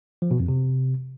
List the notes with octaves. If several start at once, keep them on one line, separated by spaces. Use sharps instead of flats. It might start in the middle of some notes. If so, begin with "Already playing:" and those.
F3
B2
F2
C3